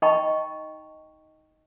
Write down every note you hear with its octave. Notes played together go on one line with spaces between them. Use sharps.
D#4 D#5 G5 A5 B5 C#6